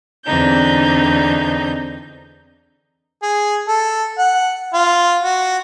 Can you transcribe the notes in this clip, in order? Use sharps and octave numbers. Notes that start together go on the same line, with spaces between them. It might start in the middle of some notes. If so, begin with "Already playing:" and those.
E2 D3 C4 D4 D#4 G6
G#4
A4
F#5
F4
F#4